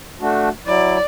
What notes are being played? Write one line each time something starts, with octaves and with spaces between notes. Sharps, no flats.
A3 D4 F#4
F#3 E4 D5